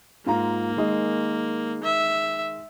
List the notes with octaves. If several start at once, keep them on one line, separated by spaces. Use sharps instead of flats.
G#2 A#3 F4 A#5
D#3 G#3 D#5
E5